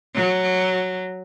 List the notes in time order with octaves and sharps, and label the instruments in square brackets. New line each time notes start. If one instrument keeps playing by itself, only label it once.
[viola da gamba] F#3